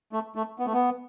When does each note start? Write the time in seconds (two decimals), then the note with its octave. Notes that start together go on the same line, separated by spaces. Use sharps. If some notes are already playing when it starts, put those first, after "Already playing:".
0.12 A3
0.35 A3
0.59 B3
0.66 A3
0.73 B3